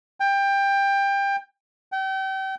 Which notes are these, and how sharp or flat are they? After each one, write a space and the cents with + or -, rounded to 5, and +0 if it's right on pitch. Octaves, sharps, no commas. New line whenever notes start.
G5 +20
G5 -35